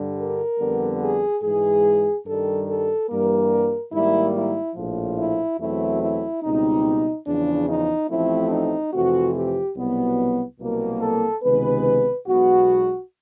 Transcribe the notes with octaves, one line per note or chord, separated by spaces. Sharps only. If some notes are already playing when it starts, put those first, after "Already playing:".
Already playing: G2 D3 G3
A#4
F2 D3 G3 B3
G#4
G#2 E3 G#3 G#4
G2 D#3 G3 A4
A4
G2 E3 G3 A#3 A#4
G#2 D#3 G3 A#3 E4
E4
A#1 A2 F3
E4
E2 B2 F#3 A3 C4 E4
E4
C#2 B2 G3 C4 D#4
E2 C#3 F3 D4
D#4
A1 A2 F3 A3 C4 E4
D#4
F2 C3 E3 A3 C4 F#4
G4
C2 B2 F#3 B3
C2 B2 F#3 A#3
A4
C#2 C3 D#3 G#3 B3 B4
B1 B2 G#3 B3 F#4